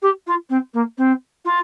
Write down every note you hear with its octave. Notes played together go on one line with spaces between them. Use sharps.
G4
F4
C4
A#3
C4
F4